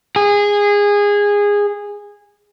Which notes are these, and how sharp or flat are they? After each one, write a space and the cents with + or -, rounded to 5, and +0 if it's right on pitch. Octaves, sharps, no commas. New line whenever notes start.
G#4 -20